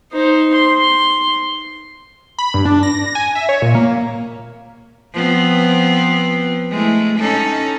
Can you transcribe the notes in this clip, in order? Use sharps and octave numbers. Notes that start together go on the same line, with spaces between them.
D#4 C5
C6
B5
G2
D4
A#6
G#5
E5
C#5
A#2
A#3
F3 B3 C4
G#3 A3 E4
C#4 D#4 A4